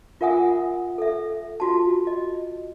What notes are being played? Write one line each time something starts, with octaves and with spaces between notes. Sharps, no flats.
F4 A#4 E5 F#5 G#5 D#6
A4 E5
F4 F#4 A5
D#5